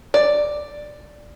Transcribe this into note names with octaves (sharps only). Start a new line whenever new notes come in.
D5